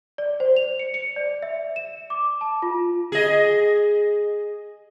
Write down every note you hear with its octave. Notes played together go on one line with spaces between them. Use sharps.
D5
C5
F7
C#7
C#7
D5
E5
E7
D6
A5
F4
G#4 D#5